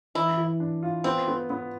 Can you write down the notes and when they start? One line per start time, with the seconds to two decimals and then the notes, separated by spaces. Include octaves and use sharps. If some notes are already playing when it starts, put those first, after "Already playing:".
0.15 E3 E4
0.38 E3
0.60 D4
0.83 F4
1.04 B3 C4
1.28 B3
1.50 B3